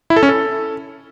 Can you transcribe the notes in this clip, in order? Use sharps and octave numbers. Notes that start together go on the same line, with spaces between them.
E4
A4
C#4
A4